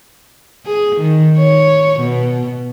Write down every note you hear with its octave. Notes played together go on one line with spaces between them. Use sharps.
G#4
D#3
C#5
B2